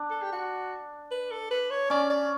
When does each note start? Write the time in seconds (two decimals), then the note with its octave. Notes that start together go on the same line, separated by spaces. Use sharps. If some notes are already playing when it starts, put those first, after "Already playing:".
Already playing: D4
0.10 A4
0.22 G4
0.32 F#4
1.11 B4
1.31 A4
1.51 B4
1.71 C#5
1.90 C#4 D5
2.10 D5